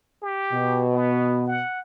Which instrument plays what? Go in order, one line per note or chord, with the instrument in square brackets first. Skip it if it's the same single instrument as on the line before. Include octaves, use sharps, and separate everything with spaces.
[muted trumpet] G4
[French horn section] B2
[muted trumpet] B3
F#5